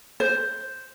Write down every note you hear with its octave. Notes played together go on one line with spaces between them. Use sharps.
C5